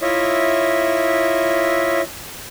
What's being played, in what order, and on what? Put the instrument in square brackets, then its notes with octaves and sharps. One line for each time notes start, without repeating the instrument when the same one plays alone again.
[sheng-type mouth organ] E4 F4 C#5 D#5 E5